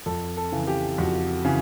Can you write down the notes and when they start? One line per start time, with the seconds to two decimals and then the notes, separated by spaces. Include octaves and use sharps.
0.06 F2 A4
0.37 A4
0.52 C#3 E3
0.67 G4
0.98 F2 F#4
1.45 C#3 E3